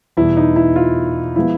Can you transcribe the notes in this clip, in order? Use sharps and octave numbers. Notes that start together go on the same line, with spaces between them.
E2 B2 G3 E4
D#4
E4
F4
F3 G#3 B3 E4